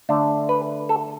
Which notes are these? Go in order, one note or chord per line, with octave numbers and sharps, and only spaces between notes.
D3 A3 D4
B4
A4